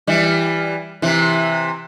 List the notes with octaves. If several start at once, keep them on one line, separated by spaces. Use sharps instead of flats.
E3 G3
C3 E3